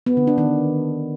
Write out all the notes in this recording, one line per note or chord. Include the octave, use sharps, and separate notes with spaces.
B3
D3
D4
D#3